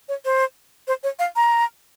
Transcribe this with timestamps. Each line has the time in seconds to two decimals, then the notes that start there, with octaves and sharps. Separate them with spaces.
0.09 C#5
0.25 C5
0.88 C5
1.03 C#5
1.19 F5
1.36 A#5